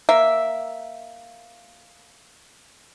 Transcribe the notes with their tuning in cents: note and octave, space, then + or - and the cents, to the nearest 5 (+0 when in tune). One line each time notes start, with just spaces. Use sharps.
A#3 +0 E5 +0